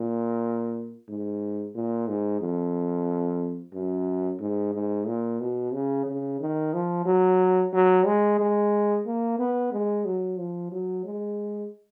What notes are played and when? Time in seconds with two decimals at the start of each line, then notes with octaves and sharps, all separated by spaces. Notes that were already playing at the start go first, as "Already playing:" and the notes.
Already playing: A#2
1.09 G#2
1.75 A#2
2.08 G#2
2.41 F2
3.74 F#2
4.40 G#2
4.74 G#2
5.07 A#2
5.40 B2
5.74 C#3
6.06 C#3
6.40 D#3
6.74 F3
7.06 F#3
7.73 F#3
8.06 G#3
8.40 G#3
9.06 A#3
9.39 B3
9.73 G#3
10.05 F#3
10.38 F3
10.72 F#3
11.05 G#3